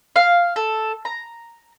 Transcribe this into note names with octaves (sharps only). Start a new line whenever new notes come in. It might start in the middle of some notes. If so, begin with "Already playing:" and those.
F5
A4
A#5